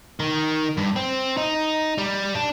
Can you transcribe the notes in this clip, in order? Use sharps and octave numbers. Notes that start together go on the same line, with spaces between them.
D#3
G2
C4
D#4
G3
D4